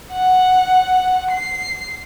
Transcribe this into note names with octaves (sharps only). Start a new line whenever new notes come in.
F#5
C7